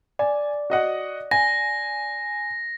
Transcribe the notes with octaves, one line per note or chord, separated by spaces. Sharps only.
D5 G#5
F#4 D#5 F#5
G#5 A#6